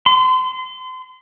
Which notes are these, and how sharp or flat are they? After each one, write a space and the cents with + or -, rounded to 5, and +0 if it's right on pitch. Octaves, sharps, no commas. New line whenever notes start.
C6 -35